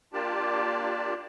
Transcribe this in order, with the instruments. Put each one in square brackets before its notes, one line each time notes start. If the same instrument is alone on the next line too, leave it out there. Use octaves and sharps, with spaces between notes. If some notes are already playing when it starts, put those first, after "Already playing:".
[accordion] A#3 D4 F4 G4 D5 A5